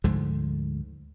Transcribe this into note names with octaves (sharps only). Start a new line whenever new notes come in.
D2 G#2 D3 F3